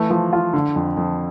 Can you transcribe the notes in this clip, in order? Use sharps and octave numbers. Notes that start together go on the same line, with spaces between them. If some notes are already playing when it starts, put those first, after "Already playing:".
Already playing: E3 A3
F3
F4
D3
F2
F2